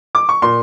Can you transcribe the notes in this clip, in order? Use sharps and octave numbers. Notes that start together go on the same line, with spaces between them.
D6
C#6
A#2 C6